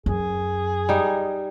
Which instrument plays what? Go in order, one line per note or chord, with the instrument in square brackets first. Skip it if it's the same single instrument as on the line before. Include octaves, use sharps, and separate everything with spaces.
[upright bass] F#2 [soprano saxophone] G#4
[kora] G3 D#4